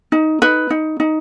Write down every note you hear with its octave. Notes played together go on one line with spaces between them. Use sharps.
D#4
D#4 B4
D#4
D#4